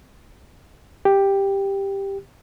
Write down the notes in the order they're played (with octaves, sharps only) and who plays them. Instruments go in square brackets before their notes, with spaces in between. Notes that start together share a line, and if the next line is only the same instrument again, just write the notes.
[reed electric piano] G4